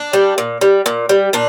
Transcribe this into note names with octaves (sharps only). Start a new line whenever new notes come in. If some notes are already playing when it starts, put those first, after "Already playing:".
Already playing: D4
G3
A#2
G3
A#2
G3
A#2 D4